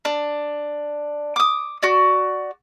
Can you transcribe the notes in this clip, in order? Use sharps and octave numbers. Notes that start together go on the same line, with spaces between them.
D4
D6 D#6
F#4 D5